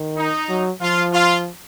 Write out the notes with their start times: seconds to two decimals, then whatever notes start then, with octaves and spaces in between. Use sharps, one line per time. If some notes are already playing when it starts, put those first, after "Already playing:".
Already playing: D#3
0.17 D#4
0.49 F#3
0.81 F3 F4
1.13 F4